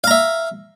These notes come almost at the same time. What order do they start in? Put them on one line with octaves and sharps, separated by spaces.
F5 A#5 E5